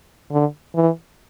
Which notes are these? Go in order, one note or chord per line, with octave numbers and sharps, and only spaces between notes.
D3
E3